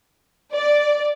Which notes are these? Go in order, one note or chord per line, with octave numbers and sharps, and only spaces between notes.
D5